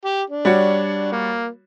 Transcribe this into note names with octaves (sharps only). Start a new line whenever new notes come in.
G4
D4
G3 F#4 C#5
A#3